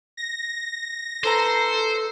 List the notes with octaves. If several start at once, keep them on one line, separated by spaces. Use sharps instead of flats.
A#6
D#4 A4 B4 C5 A#5